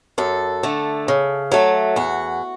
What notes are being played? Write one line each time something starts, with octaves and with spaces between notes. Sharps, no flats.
F#2 A4
D3 A3
C#3
F#3 A3
E2 F#4